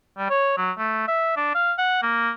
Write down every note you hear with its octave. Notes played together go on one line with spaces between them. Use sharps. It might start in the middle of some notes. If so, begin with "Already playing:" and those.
G3
C#5
F#3
A3
E5
D4
F5
F#5
A#3